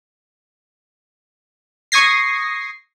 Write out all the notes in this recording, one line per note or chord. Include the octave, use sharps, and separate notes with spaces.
C#6 D#6 G#6 A#6 C7